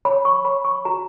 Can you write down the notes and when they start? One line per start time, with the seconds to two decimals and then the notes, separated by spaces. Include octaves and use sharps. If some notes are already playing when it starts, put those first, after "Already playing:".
0.05 C#5 B5
0.25 C#6
0.45 C#5 B5
0.65 C#6
0.85 F#4 A#5